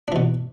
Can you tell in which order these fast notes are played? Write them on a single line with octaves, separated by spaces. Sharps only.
D4 E3 B2